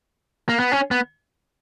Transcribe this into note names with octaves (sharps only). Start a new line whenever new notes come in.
A#3
B3
C#4
B3